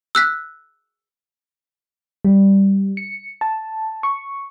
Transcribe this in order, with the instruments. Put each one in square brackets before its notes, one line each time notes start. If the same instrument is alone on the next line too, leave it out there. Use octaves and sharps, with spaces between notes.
[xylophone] E6 F#6 B6
[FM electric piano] G3
C#7
A5
C#6